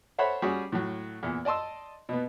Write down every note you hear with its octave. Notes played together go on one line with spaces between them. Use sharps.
A4 C5 C#5 E5 F#5 B5
G3 C#4 F#4 G#4
A2 F#3
E2 A#2
D5 D#5 A5 C6 E6
B2 B3